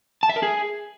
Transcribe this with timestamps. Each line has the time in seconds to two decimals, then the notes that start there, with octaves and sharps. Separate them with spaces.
0.23 A5
0.29 E5
0.36 A#4
0.43 G#4